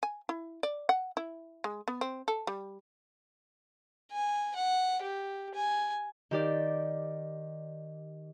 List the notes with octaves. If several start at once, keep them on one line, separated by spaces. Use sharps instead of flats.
G#5
E4
D5
F#5
E4
G#3
B3
C4
A4
G3
G#5
F#5
G4
G#5
D#3 G4 D5